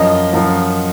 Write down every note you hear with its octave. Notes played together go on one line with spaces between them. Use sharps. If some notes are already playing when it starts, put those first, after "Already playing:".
Already playing: F#2 F3 D#5
F#2 F3